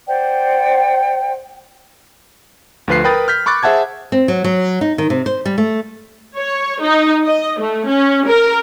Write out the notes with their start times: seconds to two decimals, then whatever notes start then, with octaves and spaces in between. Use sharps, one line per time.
0.07 C5 D5 F#5 G5
2.88 D2 F3 F4 B4 F#6 C7
3.04 A#4 B4 G5 B5 D#6 A6
3.28 F6 G6 B6
3.46 B5 C#6 D6 F#6 A6
3.63 G#4 C5 E5 F#5 A5 G#6
4.12 C4
4.28 F#3
4.44 F#3
4.81 D#4
4.98 D#3
5.10 C3
5.26 C5
5.46 G3
5.58 A3
6.36 C#5
6.82 D#4
7.25 D#5
7.60 A3
7.89 C#4
8.28 A#4